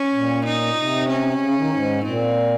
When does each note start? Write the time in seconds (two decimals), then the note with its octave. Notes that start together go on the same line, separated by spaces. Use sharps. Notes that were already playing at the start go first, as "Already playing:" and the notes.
Already playing: C#4
0.13 A#2
0.45 D#4
0.77 C3
1.09 C#4
1.40 C#3
1.57 D#3
1.72 G#2
2.04 A#2 C4